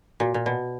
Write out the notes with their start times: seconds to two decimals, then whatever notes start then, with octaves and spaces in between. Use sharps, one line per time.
0.20 A#2 F#4
0.34 A#2
0.46 B2 D5